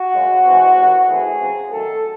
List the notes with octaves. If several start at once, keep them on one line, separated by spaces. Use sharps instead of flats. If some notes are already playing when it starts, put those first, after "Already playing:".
Already playing: F#4
F#2 C#3 G#3
G#2 E3 G#3 C4
E2 C3 D#3
F#2 E3 A3 C4 G#4
C#3 F#3 C4
F#2 D#3 F#3 A3 A4